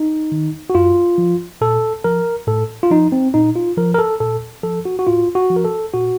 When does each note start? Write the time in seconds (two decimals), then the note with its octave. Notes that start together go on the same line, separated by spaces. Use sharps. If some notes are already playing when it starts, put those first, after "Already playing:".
Already playing: D#4
0.32 D#3
0.70 F#4
0.75 F#2 F4
1.18 F3
1.61 A#2 A4
2.04 F3 A#4
2.47 A2 A4
2.83 F4
2.91 F3 D#4
3.12 C4
3.34 A#2 D#4
3.56 F4
3.77 F3 A#4
3.94 A#4
3.99 A4
4.20 A#2 A4
4.63 F3 A4
4.85 F#4
4.99 F#4
5.07 A2 F4
5.35 F#4
5.50 F3
5.56 A#4
5.65 A4
5.94 A#2 F#4